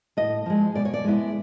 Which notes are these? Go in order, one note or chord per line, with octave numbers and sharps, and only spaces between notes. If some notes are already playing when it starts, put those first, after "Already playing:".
A2 D#5
F3 G#3
B2 D5
C#5
D5
G#3 B3 E4